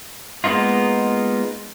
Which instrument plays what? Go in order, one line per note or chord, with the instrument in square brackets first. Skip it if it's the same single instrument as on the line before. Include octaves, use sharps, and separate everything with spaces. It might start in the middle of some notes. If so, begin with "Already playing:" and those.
[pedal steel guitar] G#3 A#3 B3 D#4 F4